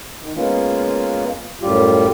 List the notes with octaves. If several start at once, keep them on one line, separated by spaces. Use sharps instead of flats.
D#3
G#3 A#3 B3 C#4 F4
F#2 A2 G3 F4 G4